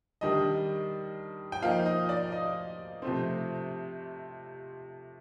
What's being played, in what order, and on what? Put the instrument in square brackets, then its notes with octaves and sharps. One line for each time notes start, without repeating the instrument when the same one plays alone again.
[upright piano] D#3 G3 D4 D#5
G5
F3 A#3 D#4 F5
D#5
D5
D#5
C3 F3 A3 C4